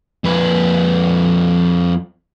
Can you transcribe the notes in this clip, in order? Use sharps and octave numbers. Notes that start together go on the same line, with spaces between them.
F2 B4